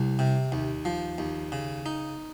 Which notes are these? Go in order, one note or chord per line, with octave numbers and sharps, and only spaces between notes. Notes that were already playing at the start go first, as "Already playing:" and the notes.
Already playing: C2
C3
D#2
F3
D#2
C#3
D#4